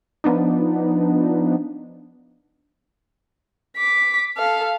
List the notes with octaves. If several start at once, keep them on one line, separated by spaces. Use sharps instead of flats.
F3 B3 D4 D#4
D6 B6
A4 F5